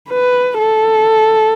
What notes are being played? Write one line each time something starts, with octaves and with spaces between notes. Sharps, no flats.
B4
A4